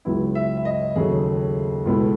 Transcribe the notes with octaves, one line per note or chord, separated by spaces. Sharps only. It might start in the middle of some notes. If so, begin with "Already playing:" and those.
C#2 C#3 F#3 B3 E4
E5
E5
D#5
D#2 C#3 F#3 A3 G#4
C#2 B2 A3 E4